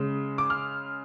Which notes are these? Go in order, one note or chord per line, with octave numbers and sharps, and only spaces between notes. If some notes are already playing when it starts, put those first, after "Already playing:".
Already playing: C#3 G#3
D6
F6